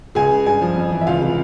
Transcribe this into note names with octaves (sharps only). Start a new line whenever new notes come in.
C#2 G#4 G#5
C#3
G2 G#4 G#5
F3
F2
E3
E5
C#2 F4 F5
C3